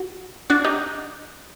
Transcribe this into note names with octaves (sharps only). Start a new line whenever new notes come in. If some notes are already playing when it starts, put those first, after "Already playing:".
Already playing: F#4
D4 F#4
D#4 G4